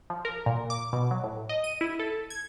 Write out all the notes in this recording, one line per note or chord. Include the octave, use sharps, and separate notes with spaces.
F3
A#4
A#2
D6
B2
F#3
A2
D#5
D#7
E4
A4
G#6